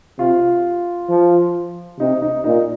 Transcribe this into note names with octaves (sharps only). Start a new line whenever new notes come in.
C3 F4
F3
C3 D#4
D#4
A#2 D#4